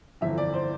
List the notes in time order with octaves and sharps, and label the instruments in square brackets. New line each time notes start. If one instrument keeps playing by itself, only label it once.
[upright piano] G1 F2 E3 E5
D5
C5